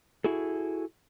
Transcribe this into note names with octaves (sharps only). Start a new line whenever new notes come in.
E4 F#4 G#4 A4